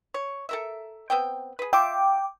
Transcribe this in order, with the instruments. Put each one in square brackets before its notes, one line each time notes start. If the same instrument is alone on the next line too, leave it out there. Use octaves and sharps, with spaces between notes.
[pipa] C#5
A4 A#4 E5
B3 C4 G5
G#4 B4
[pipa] F4 E5 [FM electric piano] G5 D6